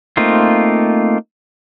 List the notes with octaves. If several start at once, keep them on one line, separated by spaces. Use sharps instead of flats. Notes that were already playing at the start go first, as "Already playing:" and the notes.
A3 A#3 C4 D#4 F4